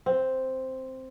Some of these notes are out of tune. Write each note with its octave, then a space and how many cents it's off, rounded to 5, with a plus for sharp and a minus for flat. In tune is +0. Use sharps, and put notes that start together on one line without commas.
C4 +0